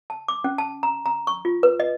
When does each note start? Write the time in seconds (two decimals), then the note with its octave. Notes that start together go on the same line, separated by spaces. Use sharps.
0.10 A5
0.28 D6
0.44 C#4
0.58 A5
0.83 A#5
1.06 A#5
1.27 C#6
1.45 F4
1.63 B4
1.80 D#5